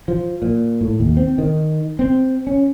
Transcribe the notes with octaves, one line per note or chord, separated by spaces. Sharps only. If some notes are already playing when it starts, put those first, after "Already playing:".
F3
A#2
A2
D#2
C4
D#3
C4
C#4